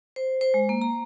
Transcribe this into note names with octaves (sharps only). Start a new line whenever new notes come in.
C5
C5
G#3
A#3
A#5